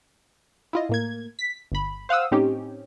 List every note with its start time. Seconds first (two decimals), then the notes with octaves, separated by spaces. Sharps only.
0.73 E4 F4 D#5
0.89 A2 A#3 G#6
1.39 B6
1.72 G1 B5
2.09 C5 F5 F#5 D#6 E6
2.31 A2 C4 C#4 D#4 G4